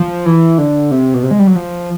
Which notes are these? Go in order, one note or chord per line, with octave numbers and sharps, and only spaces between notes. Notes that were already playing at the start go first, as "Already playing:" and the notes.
Already playing: F3
E3
D3
C3
B2
C3
G#3
G3
F#3
F3